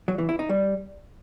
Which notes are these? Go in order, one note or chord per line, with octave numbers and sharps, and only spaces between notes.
F#3
E3
E4
D#4
G3